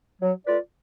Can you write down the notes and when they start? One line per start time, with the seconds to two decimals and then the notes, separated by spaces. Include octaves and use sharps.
0.22 F#3
0.47 A3 F4 B4 D5